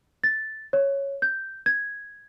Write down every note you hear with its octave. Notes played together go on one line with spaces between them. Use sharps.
A6
C#5
G6
G#6